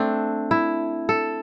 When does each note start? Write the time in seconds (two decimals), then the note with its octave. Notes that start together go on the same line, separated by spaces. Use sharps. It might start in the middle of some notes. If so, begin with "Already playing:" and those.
Already playing: A3 C4 D4
0.51 E4
1.09 A4